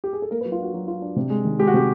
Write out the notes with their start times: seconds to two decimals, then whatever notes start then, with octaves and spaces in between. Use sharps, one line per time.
0.04 G4
0.13 G#4
0.22 A4
0.31 A#3 A#4
0.41 B4
0.45 F#3
0.52 F4
0.59 D4 F#4
0.74 F#3
0.88 F4
1.02 D4
1.16 C3
1.30 G#3
1.45 D#3
1.59 G#3 G4
1.67 F#4
1.74 C3 G4